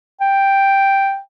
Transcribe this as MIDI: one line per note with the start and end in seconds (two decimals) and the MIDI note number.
0.21 1.18 79